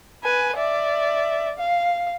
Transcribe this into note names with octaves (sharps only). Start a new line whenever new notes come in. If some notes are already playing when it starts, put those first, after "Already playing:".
B4 G#5
D5 E5
F5